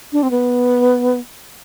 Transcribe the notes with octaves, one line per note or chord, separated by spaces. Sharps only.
D4
C4
B3